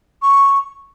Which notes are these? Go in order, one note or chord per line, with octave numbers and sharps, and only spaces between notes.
C#6